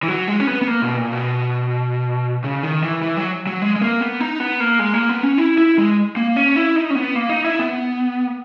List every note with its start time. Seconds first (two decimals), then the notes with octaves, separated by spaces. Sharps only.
0.03 E3
0.08 F#3
0.28 G#3
0.40 C#4
0.47 B3
0.62 B3
0.67 A#3
0.82 B2
0.97 A#2
1.12 B2
2.44 C#3
2.63 D#3
2.83 E3
3.02 E3
3.17 F#3
3.47 F#3
3.62 G#3
3.76 G#3
3.81 A#3
4.01 B3
4.20 D#4
4.40 B3
4.60 A#3
4.79 G#3
4.94 A#3
5.09 B3
5.23 C#4
5.38 E4
5.58 E4
5.78 G#3
6.17 A#3
6.36 C#4
6.56 E4
6.76 D#4
6.90 C#4
6.95 B3
7.15 A#3
7.30 D#4
7.45 E4
7.59 B3